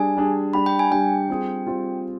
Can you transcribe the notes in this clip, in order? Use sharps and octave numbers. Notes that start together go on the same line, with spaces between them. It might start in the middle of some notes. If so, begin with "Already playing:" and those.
Already playing: G3 D4 G#4 G#5
G3 D4 G#4
G3 D4 G4 B5
G5
G#5
G3 D4 G4 G5
G3 C4 F4 G#4
G3 C4 F4 G#4